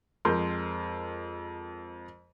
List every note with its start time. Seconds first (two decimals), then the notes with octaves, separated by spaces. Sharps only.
0.25 F2 G#3 A#4 C6 G6